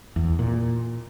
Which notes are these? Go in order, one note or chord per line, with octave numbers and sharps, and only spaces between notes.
E2
A#2